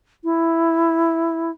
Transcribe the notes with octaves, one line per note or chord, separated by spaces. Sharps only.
E4